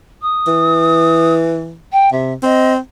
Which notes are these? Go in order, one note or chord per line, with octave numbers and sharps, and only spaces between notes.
D#6
E3
G5
C3 E5
C4 D#5